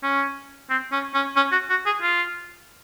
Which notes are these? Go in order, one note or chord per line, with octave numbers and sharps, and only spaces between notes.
C#4
C4
C#4
C#4
C#4
F#4
F#4
G#4
F4